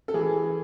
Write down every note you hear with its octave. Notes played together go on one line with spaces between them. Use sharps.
A4
E3 G#4